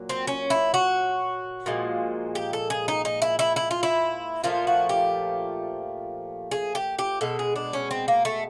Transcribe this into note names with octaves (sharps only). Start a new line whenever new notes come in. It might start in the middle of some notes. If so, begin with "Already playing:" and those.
Already playing: A#2 F#3
C4
C#4
E4
F#4
A#2 F3 G#3
G4
A4
G#4
D#4
D#4
E4
E4
E4
F4
E4
A#2 F3 A3 F4
F#4
G4
G#4
G4
G4
B2 G#3 A4
G#4
D4
C#4
C4
A#3
A3